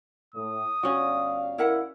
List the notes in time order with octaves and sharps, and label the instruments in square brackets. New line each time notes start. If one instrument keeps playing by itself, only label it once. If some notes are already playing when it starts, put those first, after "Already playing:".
[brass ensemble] A2 [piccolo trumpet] D#6
[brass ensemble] G1 D5 F5 [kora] C#4 F#4
[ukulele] E4 A#4 F#5